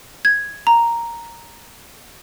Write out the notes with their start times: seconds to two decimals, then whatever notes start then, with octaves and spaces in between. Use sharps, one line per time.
0.25 G#6
0.67 A#5